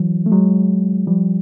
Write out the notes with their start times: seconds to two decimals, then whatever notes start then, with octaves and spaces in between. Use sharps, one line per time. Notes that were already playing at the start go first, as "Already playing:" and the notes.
Already playing: E3 F#3
0.26 A3
0.32 F#3 G#3
1.07 F3 G3